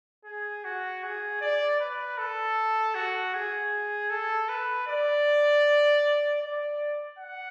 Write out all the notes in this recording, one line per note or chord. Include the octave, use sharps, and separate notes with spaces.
G#4
F#4
G#4
D5
B4
A4
F#4
G#4
A4
B4
D5
D5
F#5